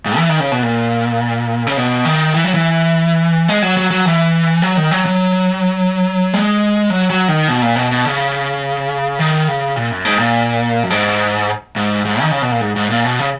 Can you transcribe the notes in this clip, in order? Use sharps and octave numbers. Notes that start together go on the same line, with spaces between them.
G#2
E3
D#3
C#3
B2
A#2
C#3
B2
D#3
E3
F#3
E3
G#3
F#3
F#3
F#3
E3
F#3
D#3
F#3
F#3
G#3
F#3
F#3
D#3
B2
A#2
B2
B2
C#3
D#3
C#3
A#2
F#2
G#2
A#2
F#2
G#2
G#2
G#2
D#3
C#3
B2
A#2
G#2
G#2
A#2
B2
C#3